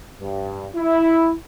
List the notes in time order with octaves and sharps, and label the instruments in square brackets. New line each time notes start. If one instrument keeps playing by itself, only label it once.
[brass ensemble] G2
E4